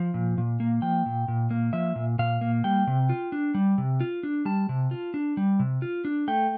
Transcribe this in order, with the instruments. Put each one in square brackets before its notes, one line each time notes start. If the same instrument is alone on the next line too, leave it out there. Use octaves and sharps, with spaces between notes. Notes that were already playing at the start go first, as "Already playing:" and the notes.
Already playing: [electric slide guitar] F3
A#2
A#2
A#3
F3 G5
A#2
A#2
A#3
F3 E5
A#2
A#2 F5
A#3
G3 G5
C3
F4
D4
G3
C3
F4
D4
G3 A5
C3
F4
D4
G3
C3
F4
D4
A3 G5